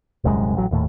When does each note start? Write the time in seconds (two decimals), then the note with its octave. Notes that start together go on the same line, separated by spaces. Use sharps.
0.24 D#1 C2 F#2 G#3
0.56 A1 F#3
0.71 D#1 D#2 A2